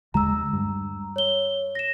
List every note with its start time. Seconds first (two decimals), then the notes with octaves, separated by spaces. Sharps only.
0.14 D#2 D3 G#3 A#5 E6
0.53 G2
1.16 C#5 G7
1.75 A#6 E7